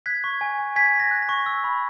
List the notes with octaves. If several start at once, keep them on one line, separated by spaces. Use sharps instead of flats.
F#6 G#6 B6
C#6
G#5
G#5
G#5 G#6 B6
G#5
A#6
F#6
A#6
C#6
E6
B5